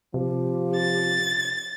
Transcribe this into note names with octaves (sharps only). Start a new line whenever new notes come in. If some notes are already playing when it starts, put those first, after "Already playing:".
C3 F3 G4
A6